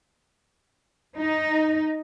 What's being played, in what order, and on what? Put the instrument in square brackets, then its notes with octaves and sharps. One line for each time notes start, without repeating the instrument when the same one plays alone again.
[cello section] D#4